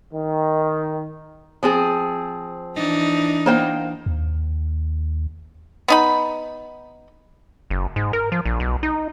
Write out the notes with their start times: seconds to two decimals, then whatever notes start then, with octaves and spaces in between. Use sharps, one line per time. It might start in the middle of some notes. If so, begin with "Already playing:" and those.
0.13 D#3
1.63 F3 C4 G#4
2.76 E3 D4 D#4
3.46 A#3 C5 G5
4.06 D#2
5.88 B3 D#4 B5
7.70 F#1
7.96 G#2
8.13 A#4
8.32 F3
8.45 A#1
8.60 B1
8.83 D#4